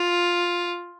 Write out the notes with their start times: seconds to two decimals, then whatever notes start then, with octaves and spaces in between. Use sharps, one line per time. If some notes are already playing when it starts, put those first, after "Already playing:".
Already playing: F4